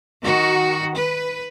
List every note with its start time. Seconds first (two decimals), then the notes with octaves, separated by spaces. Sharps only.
0.23 D#3 F#4
0.96 B4